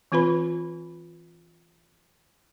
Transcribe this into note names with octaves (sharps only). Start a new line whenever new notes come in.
E3 C4 F4 B4 B5